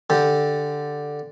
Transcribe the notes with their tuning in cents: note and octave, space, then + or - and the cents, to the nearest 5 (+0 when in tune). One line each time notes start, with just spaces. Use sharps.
D3 +0 G4 +0